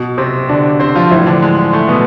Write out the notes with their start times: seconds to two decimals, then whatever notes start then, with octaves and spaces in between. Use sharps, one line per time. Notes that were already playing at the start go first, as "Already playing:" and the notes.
Already playing: B2
0.18 C3 C4
0.49 D3 D4
0.80 C4 C5
0.95 F3 F4
1.11 A2 E3 F3 E4
1.27 D3 D4
1.42 G#3
1.73 A3
1.88 B2 B3